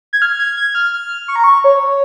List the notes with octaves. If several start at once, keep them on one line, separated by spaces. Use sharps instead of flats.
G#6
F6
G#6
G#6
F6
F6
C#6
A#5
C#6
C#5